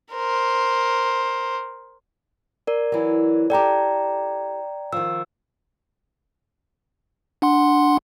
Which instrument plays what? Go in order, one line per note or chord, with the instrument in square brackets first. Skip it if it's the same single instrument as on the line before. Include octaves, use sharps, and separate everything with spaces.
[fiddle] A#4 C5
[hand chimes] A#4 D5
[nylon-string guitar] E3 F#3
[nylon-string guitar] G4 A4 [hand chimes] D5 G5 A#5
[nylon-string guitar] D#3 F3 [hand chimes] E6
[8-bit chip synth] D4 F#5 C6